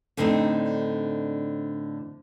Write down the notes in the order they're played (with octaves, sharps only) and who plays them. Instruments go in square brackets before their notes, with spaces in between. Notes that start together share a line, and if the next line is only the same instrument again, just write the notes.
[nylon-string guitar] A2 D3 C4 D4 D#4